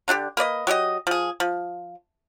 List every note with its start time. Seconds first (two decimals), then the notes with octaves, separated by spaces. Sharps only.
0.08 D3 D4 F4 G4
0.37 A#3 B4 D5 D#5
0.67 F#3 G4 G#4 D#5
1.07 F3 G#4
1.40 F3